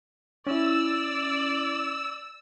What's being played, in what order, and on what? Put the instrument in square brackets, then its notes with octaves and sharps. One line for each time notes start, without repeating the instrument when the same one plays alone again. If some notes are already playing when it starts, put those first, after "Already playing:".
[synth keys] C#4 E4 [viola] D5 [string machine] E6